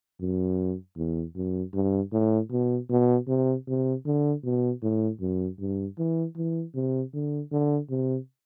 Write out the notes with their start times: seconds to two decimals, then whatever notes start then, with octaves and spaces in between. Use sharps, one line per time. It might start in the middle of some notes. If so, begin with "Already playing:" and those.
0.21 F#2
0.97 E2
1.36 F#2
1.74 G2
2.12 A2
2.51 B2
2.90 B2
3.28 C3
3.67 C3
4.06 D3
4.44 B2
4.82 A2
5.21 F#2
5.59 G2
5.98 E3
6.36 E3
6.75 C3
7.14 D3
7.52 D3
7.90 C3